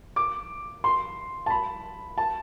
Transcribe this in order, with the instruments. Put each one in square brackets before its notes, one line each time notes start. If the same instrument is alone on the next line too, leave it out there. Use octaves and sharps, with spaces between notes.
[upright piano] D6
C6
A5
B5
A5